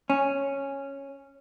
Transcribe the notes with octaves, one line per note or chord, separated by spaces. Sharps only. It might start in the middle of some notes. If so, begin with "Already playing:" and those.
C#4